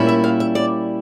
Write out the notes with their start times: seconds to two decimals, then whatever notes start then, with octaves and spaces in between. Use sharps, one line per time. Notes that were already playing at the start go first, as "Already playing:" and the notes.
Already playing: A#2 G3 A#3 C#4 E4
0.09 E5
0.24 F5
0.40 E5
0.55 D5